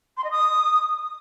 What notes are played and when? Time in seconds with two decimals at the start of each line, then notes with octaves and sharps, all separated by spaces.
0.17 C6
0.24 D#5
0.31 D#6